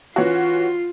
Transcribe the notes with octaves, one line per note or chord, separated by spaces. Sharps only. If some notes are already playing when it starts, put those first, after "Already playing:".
E3 C#4 F4 F#4